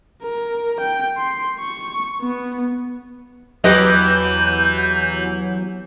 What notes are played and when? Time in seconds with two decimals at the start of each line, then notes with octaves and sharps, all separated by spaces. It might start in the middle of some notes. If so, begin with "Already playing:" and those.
0.23 A#4
0.80 G5
1.17 C6
1.60 C#6
2.22 B3
3.64 E2 E3 F#3 G4 B4 D#5 G6